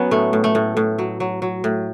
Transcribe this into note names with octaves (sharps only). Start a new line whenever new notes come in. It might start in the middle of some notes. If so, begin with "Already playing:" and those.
Already playing: F#3 B3 C#4
A2 A3
A2
A3
A2
A2
F#3
F#3
F#3
A2